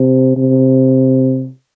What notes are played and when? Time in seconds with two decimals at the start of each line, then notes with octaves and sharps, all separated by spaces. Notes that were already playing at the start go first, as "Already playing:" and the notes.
Already playing: C3
0.37 C3